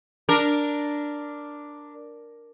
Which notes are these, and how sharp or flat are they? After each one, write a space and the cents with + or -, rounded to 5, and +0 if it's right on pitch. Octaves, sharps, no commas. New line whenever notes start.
D4 +0 A#4 +0